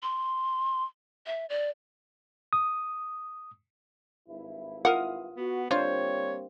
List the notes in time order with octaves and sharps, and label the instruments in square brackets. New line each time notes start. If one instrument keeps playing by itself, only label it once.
[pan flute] C6
E5
D5
[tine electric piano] D#6
[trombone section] G#1 G2 E4
[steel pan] F4 F5 D#6 [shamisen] A#4 F#5
[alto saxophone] B3 [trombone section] F#4
[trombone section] G3 A#3 C4 [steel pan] D4 C5 [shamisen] F4 [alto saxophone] C#5